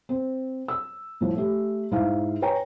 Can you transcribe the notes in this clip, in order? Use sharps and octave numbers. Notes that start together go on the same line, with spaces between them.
C4
E6
A2 F3
A3 G4
G#2 E4 F5
B4 C#5 G5 G#5 A#5